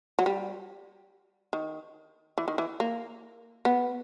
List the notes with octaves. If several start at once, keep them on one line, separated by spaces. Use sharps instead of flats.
F#3
G3
D#3
E3
D#3
E3
A#3
B3